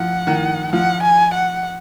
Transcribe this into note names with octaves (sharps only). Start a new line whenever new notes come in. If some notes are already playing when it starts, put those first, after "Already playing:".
Already playing: F3 F#5
D#3
F3 F#5
G#5
F#5